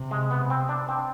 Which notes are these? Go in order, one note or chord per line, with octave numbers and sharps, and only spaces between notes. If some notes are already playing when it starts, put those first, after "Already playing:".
Already playing: C3
G#3
B3
C4
D4
C4